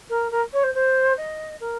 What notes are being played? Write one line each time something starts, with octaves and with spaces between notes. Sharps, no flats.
A#4
A#4
C#5
C5
C5
D#5
A#4